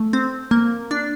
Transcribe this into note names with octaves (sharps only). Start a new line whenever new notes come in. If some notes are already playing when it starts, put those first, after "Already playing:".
Already playing: A3
C4
A#3
D4